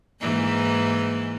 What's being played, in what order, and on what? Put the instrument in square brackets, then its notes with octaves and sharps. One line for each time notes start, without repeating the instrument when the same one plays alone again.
[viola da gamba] G#2 E3 A#3